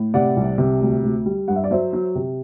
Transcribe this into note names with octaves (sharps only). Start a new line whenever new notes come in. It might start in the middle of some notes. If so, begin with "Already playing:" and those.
Already playing: A2
C3 D5 F#5
C2
C3
D2
D2
G3
G2 F#5
E5
D5
F#3 C5 E5
F#3
C3